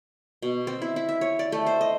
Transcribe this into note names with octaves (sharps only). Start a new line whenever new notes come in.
B2
C4
E4
E4
E5
C#5
D5
A3
C5
D#5